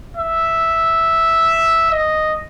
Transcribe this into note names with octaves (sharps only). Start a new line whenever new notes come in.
E5
D#5